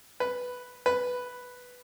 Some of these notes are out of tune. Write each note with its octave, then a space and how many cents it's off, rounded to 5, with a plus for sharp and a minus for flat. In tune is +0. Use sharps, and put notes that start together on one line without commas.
B4 +0
B4 +0